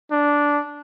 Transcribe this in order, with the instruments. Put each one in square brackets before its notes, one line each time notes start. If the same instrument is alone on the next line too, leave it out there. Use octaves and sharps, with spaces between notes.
[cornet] D4